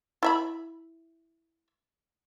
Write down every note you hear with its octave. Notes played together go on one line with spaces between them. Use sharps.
E4 E5 B5